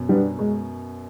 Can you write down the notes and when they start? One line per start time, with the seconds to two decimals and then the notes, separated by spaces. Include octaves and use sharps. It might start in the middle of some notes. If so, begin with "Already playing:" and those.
Already playing: F#2 B2
0.09 G3 B3 D4
0.39 G#3